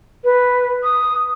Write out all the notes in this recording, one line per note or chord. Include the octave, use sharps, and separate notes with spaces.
B4
D#6